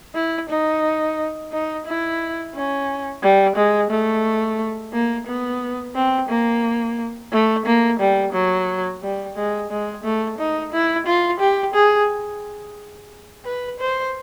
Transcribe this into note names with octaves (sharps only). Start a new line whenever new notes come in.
E4
D#4
D#4
E4
C#4
G3
G#3
A3
A#3
B3
C4
A#3
A3
A#3
G3
F#3
G3
G#3
G#3
A3
D#4
E4
F4
G4
G#4
B4
C5